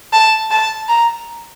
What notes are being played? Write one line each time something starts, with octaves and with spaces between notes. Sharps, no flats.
A5
A5
A#5